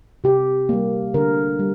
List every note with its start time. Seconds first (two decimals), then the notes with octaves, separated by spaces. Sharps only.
0.24 C3 G4
0.69 G3 A#3
1.14 D3 A#4
1.59 G3